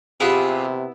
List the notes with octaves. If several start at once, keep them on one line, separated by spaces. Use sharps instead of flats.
C3 B3 E4 F4 G4 G#4